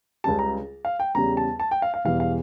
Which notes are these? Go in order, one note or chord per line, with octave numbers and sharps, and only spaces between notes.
C#2 C#3 G3 A5
A#5
F5
G5
E2 C#3 G3 A#5
A5
A5
G5
F5
F5
E1 E2 E3 G3 F5
F5